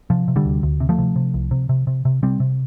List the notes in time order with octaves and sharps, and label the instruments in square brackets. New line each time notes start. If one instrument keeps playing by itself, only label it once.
[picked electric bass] C3 F3
C3
D3 G3
D2
D2
C3
F3 A3
C3
C3
C2
C3
C3
C3
C3
C3 G3 C4
C3